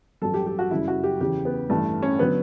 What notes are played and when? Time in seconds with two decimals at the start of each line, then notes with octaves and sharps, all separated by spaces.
0.22 A1 G2 F#3 A4
0.34 G4
0.46 G4
0.59 F#4
0.71 F#1 F#2 C#3 G3 E4
0.88 F#4
1.04 G4
1.21 E2 C#3 E3 G4
1.45 B3
1.70 A1 G2 E3 G3 A3
2.02 C#4
2.19 D3 F#3 B3